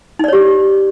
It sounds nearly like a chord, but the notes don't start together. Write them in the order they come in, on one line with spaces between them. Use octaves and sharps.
D#4 D5 C#5 G4